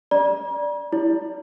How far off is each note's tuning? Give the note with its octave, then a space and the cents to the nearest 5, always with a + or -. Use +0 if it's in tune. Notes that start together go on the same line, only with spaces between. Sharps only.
D5 +0 A#5 +45
E4 +0 D5 -45